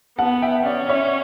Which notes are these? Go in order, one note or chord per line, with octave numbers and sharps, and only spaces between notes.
B3 F#5 A5
E5 G5
C#4 D5 F#5
C#5 E5